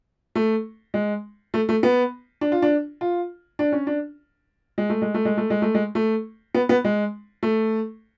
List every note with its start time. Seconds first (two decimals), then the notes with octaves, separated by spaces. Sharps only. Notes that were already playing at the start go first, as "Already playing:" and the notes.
0.35 A3
0.94 G#3
1.54 A3
1.69 A3
1.83 B3
2.41 D4
2.52 F4
2.62 D4
3.01 F4
3.59 D4
3.72 C#4
3.87 D4
4.78 G#3
4.90 A3
5.02 G#3
5.14 A3
5.25 G#3
5.37 A3
5.50 G#3
5.62 A3
5.75 G#3
5.95 A3
6.55 B3
6.69 B3
6.84 G#3
7.43 A3